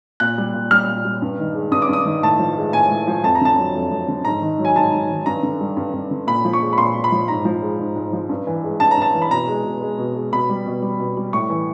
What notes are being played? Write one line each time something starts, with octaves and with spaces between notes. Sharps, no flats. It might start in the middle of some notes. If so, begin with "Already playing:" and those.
A#2 F#6
G3
A#2
G3 F6
A#2
G3
G2
D#3
G#3
G2 D#6
D6
G2 D#6
D#3
A2 A5
F3
G#3
A2 G#5
A2
F3
F2 A5
A#5
D3 A5
F#3
F2
F2
D3
G#2 A#5
D#3
F#3
G#5
G#2 A5
G#2
D#3
G2 A#5
D3
G3
G2
G2
D3
A#2 B5
F3
C#6
G#3
B5
A#2 C6
A#2
B5
F3
G#2 A#5
F3
G#3
G#2
G#2
F3
G2
E3
G#3
G2 A5
A#5
G2 A5
E3
B5
B2 A#5
G#3
B2
G#3
B2
G#3
B2 B5
G3
B2
G3
B2
G3
A2 C#6
E3